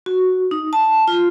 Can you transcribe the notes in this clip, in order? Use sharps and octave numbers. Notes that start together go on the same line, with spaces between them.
F#4
D#4
A5
F4